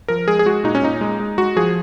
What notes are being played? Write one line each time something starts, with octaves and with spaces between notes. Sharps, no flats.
F3 A#4
G#3 G#4
G#4
G#3 F#4
A#2 D#4
C#4
A#2 D#4
G#3
G#3
G#3 F#4
F3 G#4